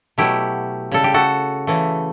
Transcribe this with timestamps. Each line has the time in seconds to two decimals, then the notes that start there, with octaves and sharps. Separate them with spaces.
0.18 B2 F#3 A3 E4 G4
0.92 C#3 G3 A4
1.04 G4
1.14 F#4 A4
1.67 C#3 E3 A3